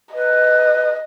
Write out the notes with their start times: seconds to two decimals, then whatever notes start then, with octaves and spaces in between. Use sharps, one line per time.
0.14 B4 D#5